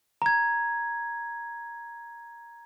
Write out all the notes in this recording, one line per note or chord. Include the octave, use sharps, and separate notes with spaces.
A#5 G#6